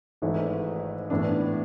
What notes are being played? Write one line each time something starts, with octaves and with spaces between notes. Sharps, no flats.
G#1 G#2 E3 A3
A2 E3 B3 D4